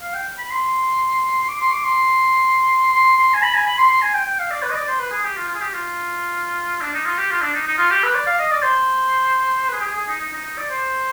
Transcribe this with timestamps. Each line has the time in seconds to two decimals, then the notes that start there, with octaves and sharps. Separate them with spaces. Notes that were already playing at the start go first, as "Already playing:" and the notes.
0.01 F5
0.14 G5
0.38 B5
0.51 C6
1.43 C6
1.48 D6
1.60 C6
1.72 D6
1.83 C6
2.93 C6
3.17 C6
3.33 G#5
3.42 B5
3.54 G#5
3.66 B5
3.78 C6
3.89 C6
4.02 G#5
4.14 G5
4.26 G5
4.39 F5
4.51 D5
4.63 B4
4.70 D#5
4.75 D5
4.87 C5
4.99 B4
5.11 G#4
5.24 G4
5.36 F4
5.48 F4
5.55 G#4
5.60 G4
5.73 F4
6.81 D4
6.94 D#4
7.06 F4
7.17 G4
7.30 F4
7.42 D4
7.54 D#4
7.67 D#4
7.78 F4
7.90 G4
8.03 B4
8.15 D5
8.26 F5
8.39 D#5
8.51 D5
8.62 C5
9.68 B4
9.73 G#4
9.80 G4
9.84 G#4
9.96 G#4
10.08 D#4
10.21 D#4
10.33 D#4
10.44 D#4
10.58 D5
10.70 C5